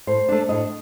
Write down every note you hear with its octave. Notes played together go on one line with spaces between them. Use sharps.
A2 C5
A3 D4
A2 D#5